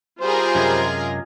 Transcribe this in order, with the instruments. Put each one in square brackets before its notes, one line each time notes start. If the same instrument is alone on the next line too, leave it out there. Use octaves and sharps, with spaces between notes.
[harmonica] G3 C5 [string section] F4 G#4 A#4
[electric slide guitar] F#2 C3 G#3